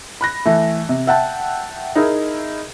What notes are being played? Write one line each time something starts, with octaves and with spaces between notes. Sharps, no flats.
B5 F#6 A#6
E3 A3
C3
E5 F#5 G5 A5
D#4 E4 G#4 A#4 E5